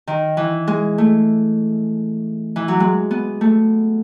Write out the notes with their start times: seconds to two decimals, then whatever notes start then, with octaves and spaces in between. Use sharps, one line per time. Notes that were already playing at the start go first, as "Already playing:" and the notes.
0.07 D#3
0.37 E3
0.67 G#3
0.98 A3
2.56 E3
2.68 F#3
2.80 G#3
3.11 B3
3.41 A3